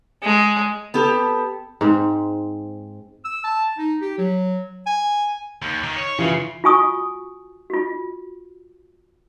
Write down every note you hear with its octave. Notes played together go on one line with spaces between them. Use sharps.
G#3
B3 G4 A4
G#2 C4
E6
A5
D#4
G4
F#3
G#5
D#2
D#3
C#5
C#3 E3 F4
F4 F#4 G#5 C#6 D#6
F4 F#4